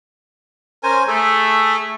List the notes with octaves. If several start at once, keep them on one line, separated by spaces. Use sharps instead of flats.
C#4 A#4 C5 G#5
A3 G#4 A4